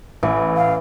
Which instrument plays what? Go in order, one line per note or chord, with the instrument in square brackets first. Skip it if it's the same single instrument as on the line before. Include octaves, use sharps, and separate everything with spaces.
[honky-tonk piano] A1 [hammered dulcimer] E3
[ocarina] F5